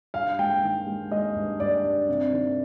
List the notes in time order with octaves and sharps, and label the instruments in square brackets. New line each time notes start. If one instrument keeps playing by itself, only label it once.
[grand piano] G2 F5
G#3 G5
D#3
G#3
G#3 D#5
G2
G2 D5
G2
C3
D#3